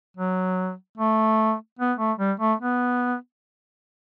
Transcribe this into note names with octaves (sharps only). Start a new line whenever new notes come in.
F#3
A3
B3
A3
G3
A3
B3